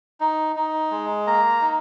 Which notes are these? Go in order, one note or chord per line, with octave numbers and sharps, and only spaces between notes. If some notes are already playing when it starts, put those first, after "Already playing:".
D#4
D#4
G#3
A#3 A#5
D#4